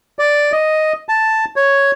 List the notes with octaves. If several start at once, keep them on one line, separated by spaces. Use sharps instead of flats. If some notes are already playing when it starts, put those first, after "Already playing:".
D5
D#5
A5
C#5